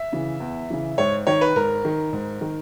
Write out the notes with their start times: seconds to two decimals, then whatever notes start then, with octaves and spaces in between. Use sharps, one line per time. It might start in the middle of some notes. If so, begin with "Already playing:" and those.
Already playing: E5
0.13 C#3 E3
0.40 E2
0.70 C#3 E3
0.98 G#2 C#5
1.27 D#3 C#5
1.41 B4
1.56 G#2 A#4
1.85 D#3
2.13 G#2
2.41 D#3